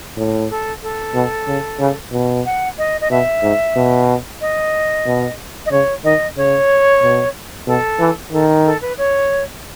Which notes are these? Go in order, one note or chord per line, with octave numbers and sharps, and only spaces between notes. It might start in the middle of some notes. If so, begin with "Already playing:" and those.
A2
A4
A4
B2
C#3
C#3
B2
F#5
D#5
D#5
B2 E5
G#2
B2
D#5
B2
D#5
C#3 C#5
D#3 D#5
C#3 C#5
B2
B2 A4
E3
D#3 A4
A4
B4
C#5